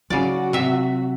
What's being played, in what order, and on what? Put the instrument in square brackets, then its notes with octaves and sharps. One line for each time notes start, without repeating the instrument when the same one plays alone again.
[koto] C#3 D5 [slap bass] F#3 [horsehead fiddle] F#4
[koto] C3 E5